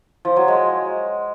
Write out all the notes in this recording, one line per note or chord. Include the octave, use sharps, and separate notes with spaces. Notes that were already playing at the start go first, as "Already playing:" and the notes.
F3
F#3
G#3